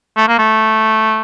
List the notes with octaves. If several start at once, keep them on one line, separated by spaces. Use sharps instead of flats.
A3
A#3
A3